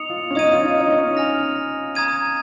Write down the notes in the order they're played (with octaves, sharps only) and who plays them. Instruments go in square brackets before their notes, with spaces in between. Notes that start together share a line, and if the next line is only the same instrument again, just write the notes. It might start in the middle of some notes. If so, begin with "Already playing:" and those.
Already playing: [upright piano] D#4 [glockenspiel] D#6 C#7 F7
[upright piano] F4
C#4
[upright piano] D#4 [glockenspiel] D#6 G#6 D#7
[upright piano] F4
D#4
D#4
C#4
[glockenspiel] G#5 F6 A#6 F7
A#5 D#6 G#6 D#7